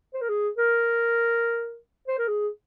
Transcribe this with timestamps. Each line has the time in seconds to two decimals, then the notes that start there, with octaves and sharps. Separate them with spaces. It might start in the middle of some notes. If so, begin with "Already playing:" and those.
0.14 C5
0.21 A#4
0.29 G#4
0.57 A#4
2.07 C5
2.18 A#4
2.28 G#4